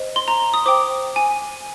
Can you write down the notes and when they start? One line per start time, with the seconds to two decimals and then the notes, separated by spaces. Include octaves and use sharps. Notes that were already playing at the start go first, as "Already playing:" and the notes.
Already playing: C5 D#5
0.16 C6
0.28 A#5
0.54 D#6
0.66 C5 G5 D6
1.16 G#5